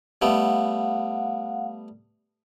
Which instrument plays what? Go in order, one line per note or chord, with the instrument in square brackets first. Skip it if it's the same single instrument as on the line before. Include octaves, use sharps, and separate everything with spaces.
[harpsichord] G3 A3 B3 [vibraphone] F5 F#5